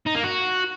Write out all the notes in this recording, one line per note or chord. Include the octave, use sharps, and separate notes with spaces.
D#4
A#3
F#4